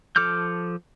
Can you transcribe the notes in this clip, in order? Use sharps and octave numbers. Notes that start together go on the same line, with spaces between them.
F3 A4 D6 F6 G6